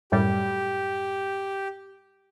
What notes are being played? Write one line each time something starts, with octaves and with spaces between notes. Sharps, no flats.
F#2 A2 G3 G4